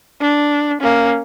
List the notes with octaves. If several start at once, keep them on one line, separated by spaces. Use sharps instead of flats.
D4
A#3 C#4